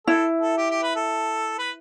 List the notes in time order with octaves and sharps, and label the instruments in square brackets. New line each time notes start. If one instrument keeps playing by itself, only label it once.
[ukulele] E4 [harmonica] A4
[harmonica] A4
G4
G4
B4
A4
B4